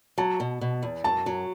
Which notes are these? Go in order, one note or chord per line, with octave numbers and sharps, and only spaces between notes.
F#3 A5
B2
B2
E2
F#2 A5
F#3